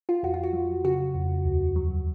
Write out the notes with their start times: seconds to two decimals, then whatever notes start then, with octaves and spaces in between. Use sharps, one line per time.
0.09 F4
0.23 F2 F#4
0.34 F4
0.43 F#4
0.53 F#3
0.84 C#3 F#4
1.15 F2
1.45 D#2
1.76 F#3